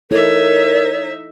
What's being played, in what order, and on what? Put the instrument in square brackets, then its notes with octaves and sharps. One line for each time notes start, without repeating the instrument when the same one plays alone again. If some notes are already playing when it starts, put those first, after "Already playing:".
[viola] D#4 E5 [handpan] E4 A4 [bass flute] A#4 [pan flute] C#5